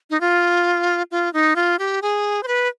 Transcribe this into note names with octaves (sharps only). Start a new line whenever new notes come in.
D#4
F4
F4
D#4
F4
G4
G#4
C5
B4